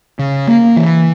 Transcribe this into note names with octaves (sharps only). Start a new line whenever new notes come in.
C#3
A#3
E3